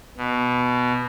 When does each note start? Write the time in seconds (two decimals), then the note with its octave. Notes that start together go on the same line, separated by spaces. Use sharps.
0.17 B2